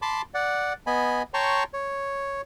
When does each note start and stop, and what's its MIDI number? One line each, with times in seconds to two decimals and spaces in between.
0.02 0.22 81
0.02 0.22 83
0.02 0.22 84
0.02 0.22 86
0.34 0.73 74
0.34 0.73 78
0.87 1.22 59
0.87 1.22 75
0.87 1.22 80
0.87 1.22 83
1.34 1.63 73
1.34 1.63 79
1.34 1.63 81
1.34 1.63 82
1.34 1.63 84
1.34 1.63 85
1.73 2.41 73